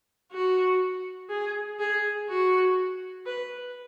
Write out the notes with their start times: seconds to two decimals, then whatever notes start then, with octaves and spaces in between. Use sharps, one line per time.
0.32 F#4
1.30 G#4
1.79 G#4
2.29 F#4
3.26 B4